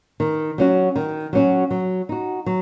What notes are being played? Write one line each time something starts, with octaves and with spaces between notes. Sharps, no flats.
D#3
F#3 C#4 F#4
D#3
F#3 C#4 F#4
F#3
D#4 F#4
F#3